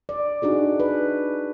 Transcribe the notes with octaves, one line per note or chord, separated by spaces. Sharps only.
D5
D4 D#4 F#4 G#4
B4